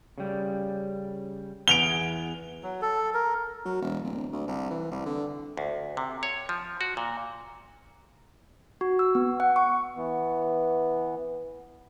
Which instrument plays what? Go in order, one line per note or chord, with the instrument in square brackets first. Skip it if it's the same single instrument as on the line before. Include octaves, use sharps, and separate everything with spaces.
[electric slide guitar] C#3 G3
[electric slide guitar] E2 B3 G#4 [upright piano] D7 F7 G7
[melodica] F#3
A4
A#4
[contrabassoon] F#3
E1
D1
D2
C2
E3
C2
D3
[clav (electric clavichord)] D2
C3
C#5
F3
F#4
A#2
[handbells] F#4
E6
B3
F#5
C#6
[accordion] E3 B3